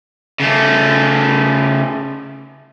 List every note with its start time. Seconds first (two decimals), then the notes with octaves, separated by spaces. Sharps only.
0.40 C#3 A3